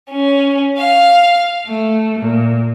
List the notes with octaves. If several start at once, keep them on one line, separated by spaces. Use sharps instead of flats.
C#4
F5
A3
A#2